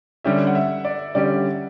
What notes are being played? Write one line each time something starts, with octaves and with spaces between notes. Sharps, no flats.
D3 G3 C#4 G4 E5
F#5
E5
D5
D3 G3 C#4 G4 D5